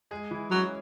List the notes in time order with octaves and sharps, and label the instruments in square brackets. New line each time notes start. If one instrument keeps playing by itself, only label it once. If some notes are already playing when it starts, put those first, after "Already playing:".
[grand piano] G#3 G#4
E3 E4
[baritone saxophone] F#3 [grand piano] C#4